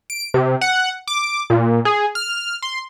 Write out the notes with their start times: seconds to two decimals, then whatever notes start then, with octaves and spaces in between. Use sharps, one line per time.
0.10 D7
0.34 C3
0.61 F#5
1.07 D6
1.50 A#2
1.85 G#4
2.15 F6
2.62 C6